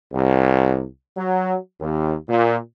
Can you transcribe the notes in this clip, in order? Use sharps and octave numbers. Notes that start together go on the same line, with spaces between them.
C2
F#3
D#2
A#2